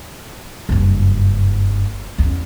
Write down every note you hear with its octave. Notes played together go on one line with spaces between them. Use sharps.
F#1 G2
E2 C#4